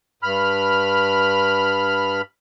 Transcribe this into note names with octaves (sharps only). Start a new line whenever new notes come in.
G2 B5 F6